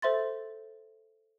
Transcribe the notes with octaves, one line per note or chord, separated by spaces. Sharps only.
A4 C5 E5 C6 A6